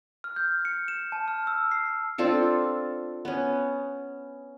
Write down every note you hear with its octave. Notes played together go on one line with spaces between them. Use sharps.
F6
G6
C#7
E7
A5
F6
E6
C7
C4 D4 F4 A4
B3 C#4